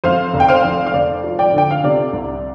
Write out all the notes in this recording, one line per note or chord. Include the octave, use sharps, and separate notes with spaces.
F2 C5 F5
F1
G5
C5 F5
F2
F5
F1 D5
F3
D5 G5
D3 G5
F5
C3 D5
C2